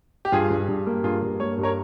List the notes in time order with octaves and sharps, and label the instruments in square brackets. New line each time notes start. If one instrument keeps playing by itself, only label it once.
[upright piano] G4
[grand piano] G2 [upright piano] F4 G#4
[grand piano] G2
G2
A#3
[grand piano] G2 [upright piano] F4 G#4
[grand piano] G2
[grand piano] A#3 [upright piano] C#5
[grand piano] G2
[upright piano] A#4 C#5